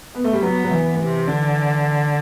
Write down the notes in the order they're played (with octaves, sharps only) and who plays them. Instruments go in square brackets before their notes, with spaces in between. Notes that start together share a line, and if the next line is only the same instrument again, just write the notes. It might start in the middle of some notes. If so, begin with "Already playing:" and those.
[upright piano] B3
A3
G3
[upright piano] F#3 [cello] B3
[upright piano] F#3
E3
[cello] C3
D3